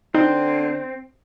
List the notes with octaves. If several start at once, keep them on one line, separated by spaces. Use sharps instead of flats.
D3 C4 D#4